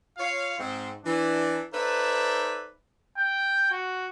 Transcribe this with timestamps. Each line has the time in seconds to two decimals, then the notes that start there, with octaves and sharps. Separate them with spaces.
0.18 F4 C#5 F5
0.59 G#2 C4
1.04 E3 D4
1.73 D#4 A4 B4 C5 D5 E5
3.18 G5
3.71 F#4